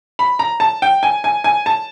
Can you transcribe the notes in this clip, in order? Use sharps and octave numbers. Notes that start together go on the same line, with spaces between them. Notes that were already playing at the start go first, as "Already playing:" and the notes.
B5
A#5
A5
G5
G#5
G#5
G#5
A5